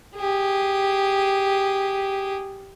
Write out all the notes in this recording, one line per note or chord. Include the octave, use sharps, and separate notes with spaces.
G4 G#4